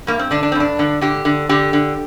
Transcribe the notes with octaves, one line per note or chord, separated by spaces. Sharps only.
G2 A#3
C4
D3 D4
D4
C4
G2 D4
D3
D3 G4
D3
D3 G4
D3